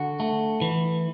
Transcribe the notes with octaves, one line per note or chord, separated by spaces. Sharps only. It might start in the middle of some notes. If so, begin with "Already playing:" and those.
Already playing: D3 F#4
A3
E3